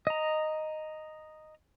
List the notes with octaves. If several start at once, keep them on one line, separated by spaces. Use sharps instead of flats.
D#5 A#5